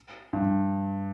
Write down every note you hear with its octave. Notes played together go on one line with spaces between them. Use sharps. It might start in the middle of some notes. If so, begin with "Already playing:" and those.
G2